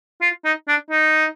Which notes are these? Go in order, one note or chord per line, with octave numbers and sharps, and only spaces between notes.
F4
D#4
D4
D#4